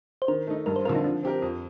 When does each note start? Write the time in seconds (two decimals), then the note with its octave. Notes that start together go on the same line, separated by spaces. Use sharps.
0.22 C5
0.28 D#3 A#4
0.47 A3 D#4
0.66 G2 A#4
0.76 C5
0.85 D3 F3 C4 F4 A#4
0.95 D#4
1.04 F3 D4
1.23 C4 G4 A#4
1.42 F2